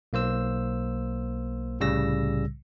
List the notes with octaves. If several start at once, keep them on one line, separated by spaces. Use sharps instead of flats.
B1 A#3 C5 E6
C2 A2 C#3 G3 E6 A#6